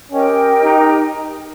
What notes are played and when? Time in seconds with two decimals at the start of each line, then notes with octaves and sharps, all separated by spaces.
0.12 C#4 G4 A#4 D#5 G5
0.64 D#4